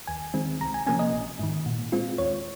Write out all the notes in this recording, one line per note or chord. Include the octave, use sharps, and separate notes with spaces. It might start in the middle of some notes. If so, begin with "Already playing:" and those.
D#2 G#5
D#3 G#3 C4
C2 A#5
G#5
C3 F3 A#3 C#4 G#5
D#5
A#1
G#2 D#3
A#2
G#3 C4 F4
D#2 C#5